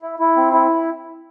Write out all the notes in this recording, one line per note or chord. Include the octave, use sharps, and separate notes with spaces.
E4
E4
C4
E4